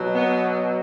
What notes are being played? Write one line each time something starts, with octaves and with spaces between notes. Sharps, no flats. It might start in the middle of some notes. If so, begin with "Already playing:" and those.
Already playing: B2 F#3
B3